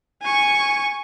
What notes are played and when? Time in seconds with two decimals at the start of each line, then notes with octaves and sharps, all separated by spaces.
0.22 G#5 C#6